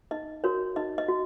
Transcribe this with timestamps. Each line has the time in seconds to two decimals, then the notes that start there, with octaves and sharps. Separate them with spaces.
0.11 D#4 D#5
0.44 F#4 A#4 C#5
0.76 D#4 D#5
0.98 D#5
1.08 F#4